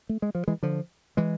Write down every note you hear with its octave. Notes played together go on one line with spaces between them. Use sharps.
A3
G#3
F3
E3 G#3
D3 F3
E3 G#3